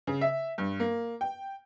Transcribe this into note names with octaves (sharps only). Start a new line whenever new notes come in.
C#3
E5
G2
A#3
G5